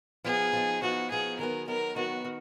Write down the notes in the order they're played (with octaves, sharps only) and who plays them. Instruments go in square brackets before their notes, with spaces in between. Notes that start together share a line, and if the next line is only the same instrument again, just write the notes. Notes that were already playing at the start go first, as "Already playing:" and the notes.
[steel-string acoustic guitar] F3 B3 D#4 [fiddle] G#4
[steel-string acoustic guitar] F3 B3 D#4
[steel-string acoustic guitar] F3 B3 D#4 [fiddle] F#4
[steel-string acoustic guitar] F3 B3 D#4 [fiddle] G#4
[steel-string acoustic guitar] D#3 F#3 B3 [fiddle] A#4
[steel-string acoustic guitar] D#3 F#3 B3 [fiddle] A#4
[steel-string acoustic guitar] D#3 F#3 B3 [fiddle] F#4
[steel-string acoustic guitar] D#3